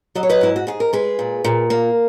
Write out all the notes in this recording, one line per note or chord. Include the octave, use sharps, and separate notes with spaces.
F#3 D#5
C#5
B4 D#5
G#2 E4
F#4
G#2 G#4
A#4
G#3 G#4 B4
A#2
A#2
A#3